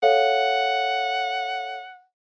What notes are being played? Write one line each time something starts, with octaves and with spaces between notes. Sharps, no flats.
A4 C#5 F5 F#5